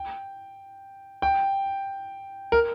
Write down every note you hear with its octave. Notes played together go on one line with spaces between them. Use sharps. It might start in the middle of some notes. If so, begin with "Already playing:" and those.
Already playing: G5
G5
A#4